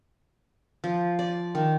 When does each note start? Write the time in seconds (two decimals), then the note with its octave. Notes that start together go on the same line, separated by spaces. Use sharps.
0.84 F3
1.19 D5
1.55 D#3